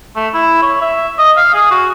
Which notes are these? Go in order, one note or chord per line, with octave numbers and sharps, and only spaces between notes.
A3
E4
C#5
E5
D#5
F5
G#4
F#4